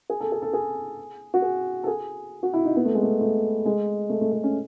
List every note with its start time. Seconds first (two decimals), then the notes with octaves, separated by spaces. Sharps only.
0.10 G#4
0.20 A4
0.32 G#4
0.42 A4
0.53 G#4
1.34 F#4
1.42 G#4
1.84 A4
1.87 G#4
2.43 F#4
2.53 E4
2.65 D#4
2.76 B3
2.85 A3
2.95 G#3
3.03 A3
3.21 A3
3.65 G#3
4.10 A3
4.21 A3
4.32 A3
4.43 C#4